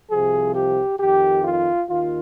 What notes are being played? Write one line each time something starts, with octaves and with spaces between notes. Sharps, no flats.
C2 C3 F3 G#4
G4
F2 D#3 G4
F4
D#2 D#3 F4